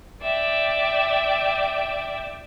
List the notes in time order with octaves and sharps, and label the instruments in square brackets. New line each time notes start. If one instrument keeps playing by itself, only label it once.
[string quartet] D5 E5 G5